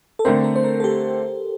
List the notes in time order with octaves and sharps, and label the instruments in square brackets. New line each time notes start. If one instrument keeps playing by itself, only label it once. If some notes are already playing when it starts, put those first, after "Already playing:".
[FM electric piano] A4
[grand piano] D3 A3 C4 [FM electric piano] A#4
[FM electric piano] A#4
C5
A#4
A4
G4